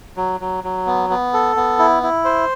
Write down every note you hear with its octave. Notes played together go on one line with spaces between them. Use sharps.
F#3
F#3
F#3
B3
B3
A4
B3
E4
E4
C5